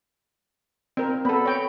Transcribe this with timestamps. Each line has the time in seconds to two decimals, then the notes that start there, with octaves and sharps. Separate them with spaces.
0.97 C4 A#4
1.25 B3 A4 B5
1.46 C#5 G5